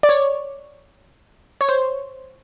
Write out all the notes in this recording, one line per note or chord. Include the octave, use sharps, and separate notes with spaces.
D5
C#5
C#5
C5